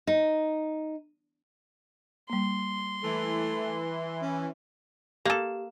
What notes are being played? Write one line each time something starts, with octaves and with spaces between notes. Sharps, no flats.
D#4
G3 A#3 C6
E3 A3
C#4
A#3 G4 A4